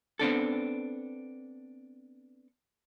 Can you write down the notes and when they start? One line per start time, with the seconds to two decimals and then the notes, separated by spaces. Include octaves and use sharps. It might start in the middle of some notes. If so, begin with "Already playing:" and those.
0.19 B3 C4 D4 A4